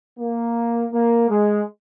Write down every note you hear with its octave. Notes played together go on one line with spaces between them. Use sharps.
A#3
A#3
G#3